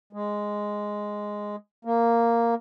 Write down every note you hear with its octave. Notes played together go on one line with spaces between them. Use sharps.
G#3
A#3